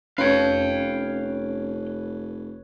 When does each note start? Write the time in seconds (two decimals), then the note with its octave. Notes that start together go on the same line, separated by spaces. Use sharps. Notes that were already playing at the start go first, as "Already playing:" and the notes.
0.18 F1 C#4 B4 C#5 F5 G5